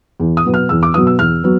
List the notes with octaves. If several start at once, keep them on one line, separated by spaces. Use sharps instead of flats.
E2
D#6
B2 F#3 B3
F6
E2 E6
D6
B2 F#3 B3 D#6
E6
E2 F6
F#3 B3